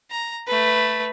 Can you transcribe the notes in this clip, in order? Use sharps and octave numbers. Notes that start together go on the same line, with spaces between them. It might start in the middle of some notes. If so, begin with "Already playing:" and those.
A#5
A3 B4